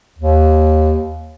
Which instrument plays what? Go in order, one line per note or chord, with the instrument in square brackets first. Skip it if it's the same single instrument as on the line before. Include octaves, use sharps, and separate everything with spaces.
[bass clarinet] D#2